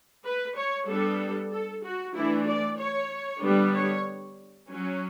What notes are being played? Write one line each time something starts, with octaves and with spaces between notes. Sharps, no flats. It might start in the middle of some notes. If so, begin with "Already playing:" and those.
B4
C#5
G3 B3 D4 A4
A4
F#4
E3 A3 D4 E4
D5
C#5
D3 G3 B3 D4
C#5
F#3 C#4